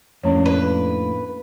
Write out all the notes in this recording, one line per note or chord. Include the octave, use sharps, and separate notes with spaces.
F2 A2 A#3 C#4 D4 C#5
B4